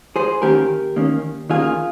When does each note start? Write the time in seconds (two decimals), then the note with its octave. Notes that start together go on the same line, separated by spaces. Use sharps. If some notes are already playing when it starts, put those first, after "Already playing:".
0.16 G#4 C5
0.42 D#3 A#3 C#4 G4 A#4
0.96 D#3 A#3 C#4
1.50 D#3 A#3 C#4 F4 G#4